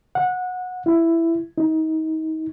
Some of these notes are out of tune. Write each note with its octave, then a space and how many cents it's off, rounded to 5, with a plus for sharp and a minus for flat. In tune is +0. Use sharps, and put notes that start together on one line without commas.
F#5 -20
E4 +10
D#4 +30